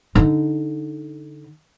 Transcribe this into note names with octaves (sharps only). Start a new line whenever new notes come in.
D3 D#4